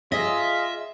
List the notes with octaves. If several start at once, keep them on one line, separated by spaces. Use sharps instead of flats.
F4 G#4 D#5 E5